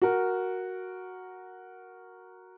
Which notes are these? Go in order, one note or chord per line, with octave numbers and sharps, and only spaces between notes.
F#4 A#4